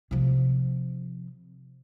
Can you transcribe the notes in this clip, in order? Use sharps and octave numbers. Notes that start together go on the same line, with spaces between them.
C3 F3